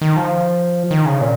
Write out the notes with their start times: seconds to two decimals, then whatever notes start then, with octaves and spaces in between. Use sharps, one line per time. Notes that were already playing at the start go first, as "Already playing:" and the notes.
0.01 D#3
0.16 F3
0.91 D#3
1.05 C#3
1.21 A#2